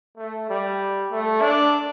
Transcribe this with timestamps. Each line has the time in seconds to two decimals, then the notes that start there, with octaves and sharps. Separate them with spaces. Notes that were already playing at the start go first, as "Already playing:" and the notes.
0.17 A3
0.49 G3
1.11 A3
1.41 D4